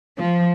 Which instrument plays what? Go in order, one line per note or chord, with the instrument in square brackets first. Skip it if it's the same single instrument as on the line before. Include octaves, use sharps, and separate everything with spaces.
[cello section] F3